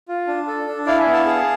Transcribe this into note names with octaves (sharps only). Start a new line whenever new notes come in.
F4
D4
A4
D4
E4 D5 F5
E5 G#5
B3
F5 A5
G#4